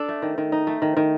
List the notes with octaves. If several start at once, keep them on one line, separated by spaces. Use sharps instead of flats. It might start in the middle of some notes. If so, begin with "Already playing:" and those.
Already playing: D4 A4
A3
D#3
D#3
D#4
A3
D#3
D#3